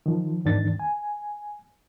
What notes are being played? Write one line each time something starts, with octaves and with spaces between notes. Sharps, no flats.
D#3 F3
E2 G#2 D#3 D4 A6
G#5